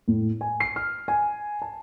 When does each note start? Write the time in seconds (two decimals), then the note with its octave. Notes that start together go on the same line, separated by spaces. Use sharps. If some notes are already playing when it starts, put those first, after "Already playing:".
0.08 A2
0.41 G#5
0.60 C7
0.76 F6
1.08 G#5
1.62 A5